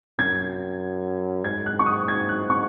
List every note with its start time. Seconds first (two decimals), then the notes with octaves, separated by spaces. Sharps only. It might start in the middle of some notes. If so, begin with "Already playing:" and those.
0.19 F#2 G#6
1.44 G#2 G#6
1.66 F#6
1.79 C#6
1.86 D#6
2.08 G#6
2.29 F#6
2.50 C#6